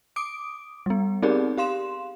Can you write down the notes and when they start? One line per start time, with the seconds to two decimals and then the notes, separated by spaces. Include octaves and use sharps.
0.16 D6 D#6 D7
0.86 G3 B3
1.22 C4 D#4 G4 G#4 A#4 D5
1.58 G4 F5 C6 E7